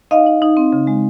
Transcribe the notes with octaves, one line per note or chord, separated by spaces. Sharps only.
D#4 D#5 F5
D#4
D#4
C4
C#3
G#3